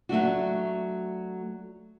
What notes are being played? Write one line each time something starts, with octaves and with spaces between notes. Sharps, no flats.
F#3 A3 D4 F#4